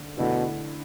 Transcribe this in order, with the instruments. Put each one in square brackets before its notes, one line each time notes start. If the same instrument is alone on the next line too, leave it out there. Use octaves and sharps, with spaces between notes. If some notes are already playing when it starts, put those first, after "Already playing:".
Already playing: [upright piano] D3
[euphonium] B2 [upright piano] D3 A3 E4